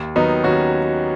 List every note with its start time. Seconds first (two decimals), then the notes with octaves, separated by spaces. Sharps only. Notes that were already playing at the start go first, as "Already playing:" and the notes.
Already playing: D#2
0.15 D#3 F#3 B3 D#4
0.43 D#2 C#4 F#4